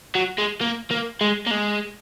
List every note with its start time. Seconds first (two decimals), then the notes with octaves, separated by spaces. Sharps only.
0.15 F#3
0.38 G#3
0.61 A#3
0.91 A#3
1.21 G#3
1.47 A#3
1.51 G#3